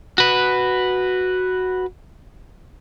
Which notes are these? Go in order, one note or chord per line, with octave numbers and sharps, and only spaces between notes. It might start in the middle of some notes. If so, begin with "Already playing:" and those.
F#4 B4